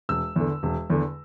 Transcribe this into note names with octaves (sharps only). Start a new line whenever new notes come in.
E1 E6
E2 D3
E1
E2 D3